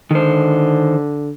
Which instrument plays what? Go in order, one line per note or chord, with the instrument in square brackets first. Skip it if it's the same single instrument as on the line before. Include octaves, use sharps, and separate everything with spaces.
[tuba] D3 [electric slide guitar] D#3 C5